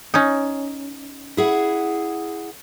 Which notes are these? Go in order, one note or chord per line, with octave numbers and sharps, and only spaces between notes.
C#4 D#4
E4 G#4 F#5